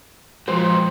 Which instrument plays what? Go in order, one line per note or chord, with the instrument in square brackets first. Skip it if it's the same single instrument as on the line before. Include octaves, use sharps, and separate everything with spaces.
[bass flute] F3 [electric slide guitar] G#3 F#4 [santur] C5